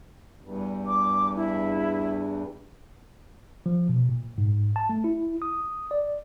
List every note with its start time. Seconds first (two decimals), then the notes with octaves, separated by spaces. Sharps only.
0.41 E2 G2
0.87 D6
1.36 E4
3.66 F3
3.89 B2
4.09 A#2
4.38 G#2
4.76 A5
4.89 A3
5.04 E4
5.42 D#6
5.91 D5